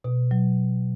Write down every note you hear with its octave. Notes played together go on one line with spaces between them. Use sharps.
B2
F#3